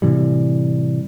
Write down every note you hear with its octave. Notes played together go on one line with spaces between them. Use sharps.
A2 C3 E3 G3